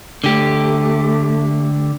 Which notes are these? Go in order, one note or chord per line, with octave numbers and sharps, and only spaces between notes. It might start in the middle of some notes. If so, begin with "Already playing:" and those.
D3 A3 G4